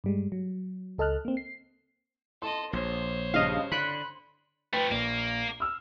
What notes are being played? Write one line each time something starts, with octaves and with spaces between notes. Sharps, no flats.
G2 G3 G#3
F#3
C#2 A4 D#5 A5 F6 F#6
A#3 C4
C7
A4 D#5 C6
A#1 C5 C#5
G2 C#3 D#5 F5
D3 B5 C6 F#6
F3 A3 B4 G5
A#1 A#3
E6 F6